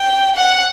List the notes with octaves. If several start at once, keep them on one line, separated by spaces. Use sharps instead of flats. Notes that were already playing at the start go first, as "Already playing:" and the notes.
Already playing: G5
F#5